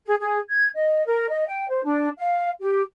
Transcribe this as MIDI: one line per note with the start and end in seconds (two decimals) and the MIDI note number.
0.05 0.14 68
0.19 0.38 68
0.49 0.68 92
0.75 1.05 75
1.06 1.27 70
1.30 1.45 75
1.48 1.67 79
1.69 1.83 72
1.84 2.08 62
2.18 2.49 77
2.60 2.81 67